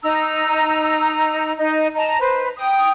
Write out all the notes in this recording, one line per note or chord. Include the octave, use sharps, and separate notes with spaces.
D#4 A#5 E6
D#4 D#5
D#5 A5 A#5
B4 C5
G5 D#6